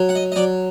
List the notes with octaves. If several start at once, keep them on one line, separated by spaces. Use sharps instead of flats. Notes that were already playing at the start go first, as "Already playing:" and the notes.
Already playing: F#3
F#5
D#5
D#5
F#3 D5